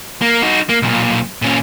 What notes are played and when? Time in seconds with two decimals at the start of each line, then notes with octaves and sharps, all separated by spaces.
0.21 A#3
0.42 D#4 F#4
0.69 A#3
0.82 B1 A#2
1.42 A#2 C#4